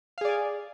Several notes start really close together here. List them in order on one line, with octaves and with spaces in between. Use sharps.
F5 G#4 D5 G#5